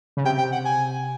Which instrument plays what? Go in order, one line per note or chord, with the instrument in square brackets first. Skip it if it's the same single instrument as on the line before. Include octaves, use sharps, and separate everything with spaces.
[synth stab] C#3
[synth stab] C3 [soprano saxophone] G5
[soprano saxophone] G5
F#5
G#5